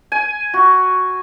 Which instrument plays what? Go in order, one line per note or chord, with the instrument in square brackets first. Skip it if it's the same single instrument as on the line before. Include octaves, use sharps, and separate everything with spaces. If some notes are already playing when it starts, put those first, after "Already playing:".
[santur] G#5
F#4